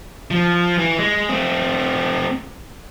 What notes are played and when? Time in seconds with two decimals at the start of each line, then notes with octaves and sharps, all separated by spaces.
0.31 F3
0.78 E3
0.99 G#3
1.29 A3 C4